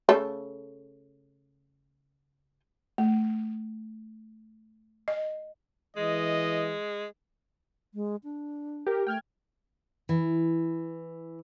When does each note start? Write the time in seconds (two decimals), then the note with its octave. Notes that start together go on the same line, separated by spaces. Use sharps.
0.09 C#3 A3 A4
2.98 A3
5.08 D#5
5.97 E3 G#3 D#5
7.94 G#3
8.24 D4
8.87 G4 A#4
9.07 A3 G5 F6 G#6
10.09 E3